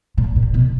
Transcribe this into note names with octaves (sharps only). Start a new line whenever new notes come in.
A#2
A#2
B2